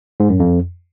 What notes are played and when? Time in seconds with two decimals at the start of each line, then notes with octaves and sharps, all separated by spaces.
0.20 G#2
0.30 F#2
0.40 F2